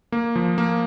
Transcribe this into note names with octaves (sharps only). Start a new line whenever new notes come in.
A#3
F3
A#3